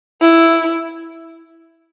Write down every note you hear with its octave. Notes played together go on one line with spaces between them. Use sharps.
E4